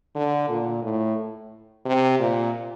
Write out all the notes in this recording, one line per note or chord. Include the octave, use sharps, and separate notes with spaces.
D3
A#2
A2
C3
A#2